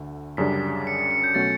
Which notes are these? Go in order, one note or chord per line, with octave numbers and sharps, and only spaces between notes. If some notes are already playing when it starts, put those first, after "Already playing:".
Already playing: D2 D3 A3
F#2 C#3 G3 D4 B6
C#7
C#7
C#7
G6
B2 F#3 A3 C#4 A6